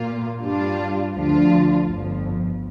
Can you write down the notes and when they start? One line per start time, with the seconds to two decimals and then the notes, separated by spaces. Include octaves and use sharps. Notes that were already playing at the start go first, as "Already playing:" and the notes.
Already playing: A#2 A#3 F4
0.40 G2 G3 D4 F4
1.13 D2 D3 F3 D4 F4
1.87 G1 F2 F3